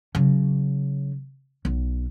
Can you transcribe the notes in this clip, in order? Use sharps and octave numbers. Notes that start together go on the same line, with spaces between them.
C#3 F#3
B1